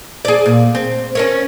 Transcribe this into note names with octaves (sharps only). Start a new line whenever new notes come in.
G#4 D5
A#2
C4
C#4 A#4 C#5